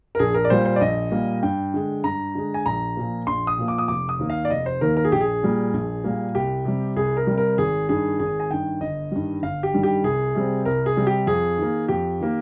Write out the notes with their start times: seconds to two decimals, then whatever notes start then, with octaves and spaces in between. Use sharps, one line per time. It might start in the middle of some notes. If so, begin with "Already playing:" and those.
0.15 A#4
0.19 A#1 G#4
0.34 A#4
0.45 D5
0.50 A#2 G3 A#3 C5
0.65 C5
0.76 D5
0.81 A#1 D#5
1.12 A#2 G3 A#3
1.43 G2 G5
1.74 D3 G#3
2.04 G2 A#5
2.35 D3 G#3
2.54 G#5
2.66 A#1 A#5
2.97 A#2 F3 A#3
3.27 A#1 C6
3.47 D#6
3.58 A#2 F3 A#3
3.68 D6
3.78 D#6
3.88 F1 D6
4.09 D#6
4.19 D#2 D#3 A#3
4.30 F5
4.45 D5
4.50 F1 D#5
4.66 C5
4.81 D#2 D#3 A#3 A#4
4.97 A#4
5.04 G#4
5.12 A#1 G4
5.21 G#4
5.43 A#2 G3 A#3
5.73 A#1
6.04 A#2 G3 A#3
6.35 C2 G4
6.65 C3 G3
6.96 C2 G#4
7.17 A#4
7.27 C3 G3
7.38 A#4
7.58 G#1 G#4
7.89 G2 D#3 G#4
8.19 G#1 G#4
8.40 G#5
8.50 G2 D#3 G5
8.81 G1 D#5
9.12 G2 D#3 G3
9.43 G1 F5
9.63 G4
9.74 G2 D#3 G3
9.83 G4
10.04 C2 G#4
10.35 C3 G3 C4
10.65 C2 A#4
10.86 G#4
10.97 C3 G3 C4
11.07 G4
11.27 F2 G#4
11.58 D#3 A#3
11.88 F2 G4
12.20 D#3 A#3